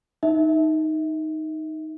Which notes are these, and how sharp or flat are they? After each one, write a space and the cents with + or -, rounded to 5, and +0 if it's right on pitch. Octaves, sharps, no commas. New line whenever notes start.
D#4 +5 E5 -20